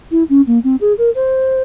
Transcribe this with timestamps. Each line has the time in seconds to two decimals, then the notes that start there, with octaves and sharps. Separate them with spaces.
0.11 E4
0.29 C#4
0.47 A#3
0.64 C4
0.81 G#4
0.98 A#4
1.15 C5